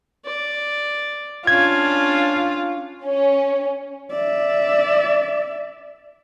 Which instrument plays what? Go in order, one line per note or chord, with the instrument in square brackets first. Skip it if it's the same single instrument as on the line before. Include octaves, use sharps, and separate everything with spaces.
[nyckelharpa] D5
[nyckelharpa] C#4 D4 [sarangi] F4 [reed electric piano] G#6
[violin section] C#4
[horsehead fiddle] D5 E5